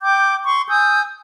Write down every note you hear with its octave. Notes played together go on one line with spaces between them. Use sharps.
G5 D6 G6
C6 C#6
G#5 D#6 E6 G6